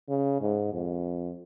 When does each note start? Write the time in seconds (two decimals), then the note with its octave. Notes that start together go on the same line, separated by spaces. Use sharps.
0.09 C#3
0.41 G#2
0.73 F2